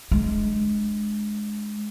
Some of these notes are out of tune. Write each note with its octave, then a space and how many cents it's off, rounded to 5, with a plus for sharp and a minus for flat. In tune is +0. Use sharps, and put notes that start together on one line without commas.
G#3 +15 D4 +25